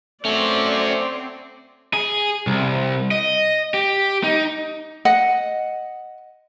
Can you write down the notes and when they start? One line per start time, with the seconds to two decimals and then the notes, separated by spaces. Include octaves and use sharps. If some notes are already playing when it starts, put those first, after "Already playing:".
0.25 A3 C4 C#4 F#4 D5
1.94 G#4
2.47 C2
3.11 D#5
3.74 G4
4.24 D#4
5.05 D#5 F#5